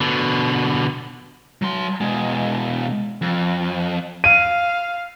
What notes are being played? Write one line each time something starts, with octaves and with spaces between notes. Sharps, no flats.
B2 D3
F#3 C6
B2 G#3
F2
F5 D#7